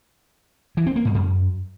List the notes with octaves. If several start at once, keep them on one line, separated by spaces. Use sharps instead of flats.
E3
C4
A#3
G#2
F#2